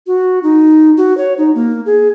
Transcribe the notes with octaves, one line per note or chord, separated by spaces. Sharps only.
F#4
D#4
F#4
C#5
D#4
A#3
G#4